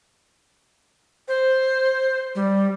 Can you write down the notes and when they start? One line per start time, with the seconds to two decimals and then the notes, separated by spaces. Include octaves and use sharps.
1.28 C5
2.35 G3